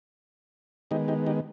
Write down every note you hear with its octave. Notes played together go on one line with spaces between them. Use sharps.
D#3 G#3 B3 D#4 G4
D#4 G4
D#4 G4